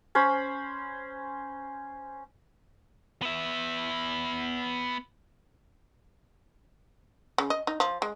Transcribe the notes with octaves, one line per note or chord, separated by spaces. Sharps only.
C#4 C5 B5
B3 E5
C#3
D#5
D#4
F3
G#3